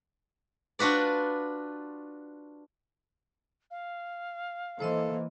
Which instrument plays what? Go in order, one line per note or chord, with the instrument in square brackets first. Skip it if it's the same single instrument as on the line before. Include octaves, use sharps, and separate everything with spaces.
[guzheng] D4 F4 F#4 B4 D5
[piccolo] F5
[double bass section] E3 A#3 [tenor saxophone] A4 [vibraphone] C5 D#5 C6